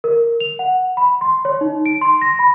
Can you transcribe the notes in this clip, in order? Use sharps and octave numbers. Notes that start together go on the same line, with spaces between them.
A#4
F7
F#5
B5
C6
C#5
D#4
D7
C6
A#6
B5